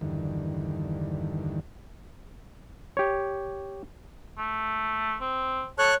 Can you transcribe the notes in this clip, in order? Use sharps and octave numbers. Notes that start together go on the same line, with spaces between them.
E2 G2 D3 D#3
G4 C#5
A3
C4
A4 C#5 C#6 F#6